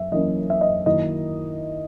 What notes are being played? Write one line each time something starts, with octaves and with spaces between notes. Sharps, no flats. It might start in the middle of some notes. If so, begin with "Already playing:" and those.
Already playing: F#2 E5
F#2 E3 A#3 C#4 D#5
E5
D#5
D#3 F#3 A#3 E4 D#5